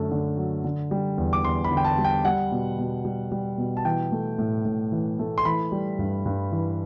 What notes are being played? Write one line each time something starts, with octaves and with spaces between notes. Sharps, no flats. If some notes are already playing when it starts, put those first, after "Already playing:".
Already playing: F#2 D3 A3
D3
F#3
D3
G3
E2
D6
E2 C6
B5
D3
G5
A5
G3
G5
G3 F#5
B2
B2
G3
G3
B2
A5
E3 G5
A3
A2
A2
E3
A3
C6
E3 B5
G3
G2
G2
E3